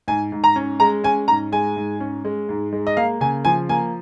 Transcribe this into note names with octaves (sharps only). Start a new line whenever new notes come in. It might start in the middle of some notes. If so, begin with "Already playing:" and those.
G#2 G#5
G#2
A#5
C#4
G#3 A#5
C#4 G#5
G#2 A#5
G#3 G#5
G#2
C#4
G#3
G#2
G#3
D#5
A#3 F5
C#3 G#5
F3 G#5
A#3 G#5